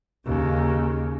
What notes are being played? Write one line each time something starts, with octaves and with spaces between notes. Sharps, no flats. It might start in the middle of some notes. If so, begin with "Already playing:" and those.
D#2 C#3